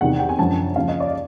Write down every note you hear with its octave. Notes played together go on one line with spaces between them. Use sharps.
E2 C3 D#3 F#5
G5
G#5
F#2 D3 F3 A5
D#2 C#3 F3 F5
D#5
D5